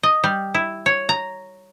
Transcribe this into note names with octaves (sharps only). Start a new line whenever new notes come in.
D#5
G3
E4
C#5
A#5